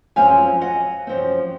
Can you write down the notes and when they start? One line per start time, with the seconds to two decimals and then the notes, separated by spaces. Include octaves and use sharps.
0.16 F#2 F3 C4 F5 G#5
0.61 D#5 F#5
1.07 F#2 F3 C4